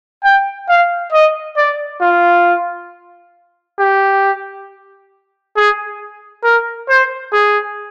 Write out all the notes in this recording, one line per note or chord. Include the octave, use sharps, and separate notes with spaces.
G5
F5
D#5
D5
F4
G4
G#4
A#4
C5
G#4